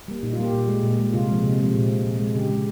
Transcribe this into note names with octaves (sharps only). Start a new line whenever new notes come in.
G3 A#3
A#2 D#4
F4
G3 A#3 G4
A#2
G#3
A#2
G#3
C3 F4
F3 G#3
C3
F3 G#3
A#2
G#3
A#2
G#3
C#3 G4
G#3